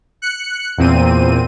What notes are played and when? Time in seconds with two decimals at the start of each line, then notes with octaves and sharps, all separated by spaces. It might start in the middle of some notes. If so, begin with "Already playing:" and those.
0.22 F#6 C#7
0.78 E2 A#2 C4 D#7